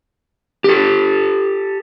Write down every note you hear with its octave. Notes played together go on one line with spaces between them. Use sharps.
G4 A4